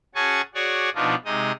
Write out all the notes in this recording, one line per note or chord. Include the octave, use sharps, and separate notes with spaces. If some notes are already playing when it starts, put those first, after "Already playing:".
C#4 F#4 G#4 G#5 A5 C#6
F#4 G#4 C#5 D5 F#5
B2 F3 B3 D4 D#4 F4
C3 G#3 D#4 D#5